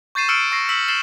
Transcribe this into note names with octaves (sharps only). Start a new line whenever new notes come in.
C#6 G6 A6 C7 D#7 E7
E6 F6 C#7 D7 E7
C#6 E6 A#6 C7
E6 B6 F#7
A6 C7 E7 F#7 G7